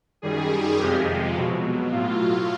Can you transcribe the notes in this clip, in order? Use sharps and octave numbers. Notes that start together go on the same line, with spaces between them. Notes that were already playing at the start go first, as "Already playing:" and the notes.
F#2 D#3 G3 G#4
F2 C3 F3 G#3 G4
B2 F#3
A2 F#3 F4